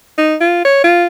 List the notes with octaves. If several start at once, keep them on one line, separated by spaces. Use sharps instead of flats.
D#4
F4
C#5
F4